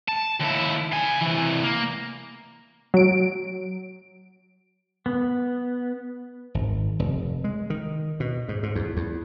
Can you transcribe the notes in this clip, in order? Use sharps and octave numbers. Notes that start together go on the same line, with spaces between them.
A5
D#2 E4
F5 G#5
C3 E3
A#3
F#3 D7
B3
G#1
F1
G#3
D#3
B2
G#2
G#2
E2
E2